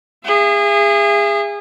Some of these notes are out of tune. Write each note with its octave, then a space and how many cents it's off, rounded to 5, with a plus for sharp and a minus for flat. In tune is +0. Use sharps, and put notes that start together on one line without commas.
G#4 -25 E5 +40